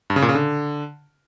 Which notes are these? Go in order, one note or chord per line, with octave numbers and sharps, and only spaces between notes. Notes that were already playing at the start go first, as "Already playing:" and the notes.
G2
C#3
A#2
C#3
D3